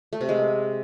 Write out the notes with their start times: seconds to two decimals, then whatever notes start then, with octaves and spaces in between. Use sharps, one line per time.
0.13 A3
0.21 C3
0.29 G#3